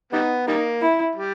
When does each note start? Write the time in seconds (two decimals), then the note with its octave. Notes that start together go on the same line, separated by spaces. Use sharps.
0.13 G3 B3 D#4
0.47 G3 A#3 D#4
0.81 E4
1.15 G3